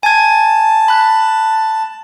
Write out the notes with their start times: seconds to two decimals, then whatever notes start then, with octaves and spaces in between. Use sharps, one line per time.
0.03 G#5 A5 G#6
0.88 B5 F#6